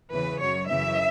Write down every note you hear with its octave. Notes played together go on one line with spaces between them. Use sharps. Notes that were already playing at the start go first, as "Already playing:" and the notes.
E2 C#3 E3 B4
F#2 F#3 C#5
F#2 C#3 E3 E5